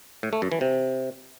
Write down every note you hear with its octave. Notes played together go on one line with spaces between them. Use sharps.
A2
A3
F#2
E3
C3